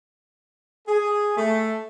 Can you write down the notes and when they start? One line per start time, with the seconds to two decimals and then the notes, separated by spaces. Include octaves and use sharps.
0.88 G#4
1.37 A3